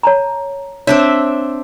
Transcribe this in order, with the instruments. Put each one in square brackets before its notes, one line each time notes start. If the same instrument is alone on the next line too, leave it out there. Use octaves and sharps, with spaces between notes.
[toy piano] C#5 A5 A#5
[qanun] C4 D4 E5 [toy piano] C#5